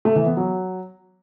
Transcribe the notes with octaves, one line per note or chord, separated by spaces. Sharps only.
A3
E3
B3
F#3